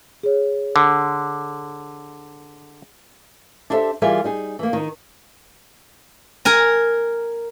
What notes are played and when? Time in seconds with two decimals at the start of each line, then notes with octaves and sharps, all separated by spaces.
0.23 G#4 C#5
0.76 D3
3.70 D4 E4 G4 A4 C5 E5
4.02 E3 G3 F4 G#4 A#4 E5
4.24 G3 D#4 G#4
4.59 E3 A#3
4.73 D#3 D#4
6.45 A#4 G#5 A#5